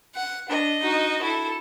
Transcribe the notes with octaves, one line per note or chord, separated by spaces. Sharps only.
F#5
D4 D#5
D#4 F#4
E4 A4